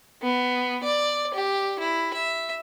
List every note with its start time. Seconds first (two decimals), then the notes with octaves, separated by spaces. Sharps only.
0.22 B3
0.83 D5
1.34 G4
1.79 E4
2.14 E5